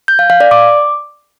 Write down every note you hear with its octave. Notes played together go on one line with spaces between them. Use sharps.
G6
F5
F5
D5
D6